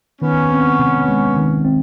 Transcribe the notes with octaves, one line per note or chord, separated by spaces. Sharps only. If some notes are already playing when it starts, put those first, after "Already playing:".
D#3 B3 C#4
C4
C3
G#3
D#3
C4